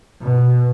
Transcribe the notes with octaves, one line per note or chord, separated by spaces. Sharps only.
B2